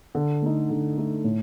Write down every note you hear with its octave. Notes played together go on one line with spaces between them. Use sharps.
D3
A3 D#4
D3
A3 D#4
A2